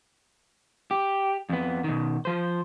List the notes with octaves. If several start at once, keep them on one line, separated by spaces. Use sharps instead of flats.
G4
F2 B3
B2 D#3
F3 C5